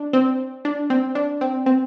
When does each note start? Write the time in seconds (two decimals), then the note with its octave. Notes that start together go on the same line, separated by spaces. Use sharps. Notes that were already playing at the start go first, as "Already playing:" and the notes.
Already playing: D4
0.13 C4
0.65 D4
0.90 C4
1.15 D4
1.41 C4
1.66 C4